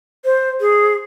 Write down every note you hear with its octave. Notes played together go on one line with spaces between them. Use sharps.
C5
G#4